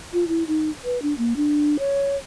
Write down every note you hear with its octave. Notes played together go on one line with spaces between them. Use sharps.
F4
E4
D#4
B4
D4
A#3
D4
C#5